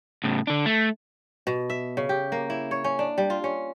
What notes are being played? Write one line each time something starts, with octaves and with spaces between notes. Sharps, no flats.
A2 C#3
D3 D4
A3
B2
E5
C#3
G4
A#3
E4
C#5
C#4
D4
G3
F4
C#4